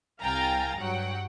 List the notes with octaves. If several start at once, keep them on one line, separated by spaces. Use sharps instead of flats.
C2 F5 G5 G#5 A#5 A6
G2 F#3 F#5 G5